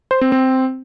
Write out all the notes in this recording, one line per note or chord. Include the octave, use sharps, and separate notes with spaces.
C5
C4
C4